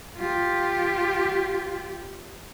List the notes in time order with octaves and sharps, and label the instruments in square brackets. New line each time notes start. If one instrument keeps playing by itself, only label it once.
[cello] F4 G4